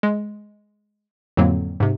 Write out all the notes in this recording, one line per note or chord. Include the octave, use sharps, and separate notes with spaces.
G#3
F2 A2 D3 F#3 A#3 C4
G#2 C3